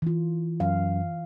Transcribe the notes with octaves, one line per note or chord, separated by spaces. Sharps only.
E3 F4
F#2 F5